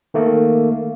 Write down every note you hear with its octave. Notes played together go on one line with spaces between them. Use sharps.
D#3 A3 A#3